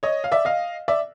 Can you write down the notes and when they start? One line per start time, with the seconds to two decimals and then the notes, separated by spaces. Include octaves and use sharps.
0.03 C#5 D#5
0.24 F5
0.32 D5 E5
0.45 D#5 F5
0.88 D5 E5